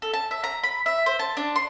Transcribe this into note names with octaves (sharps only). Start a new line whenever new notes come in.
A4
A5
E5
A#5
B5
E5
C5
A5
D4
C6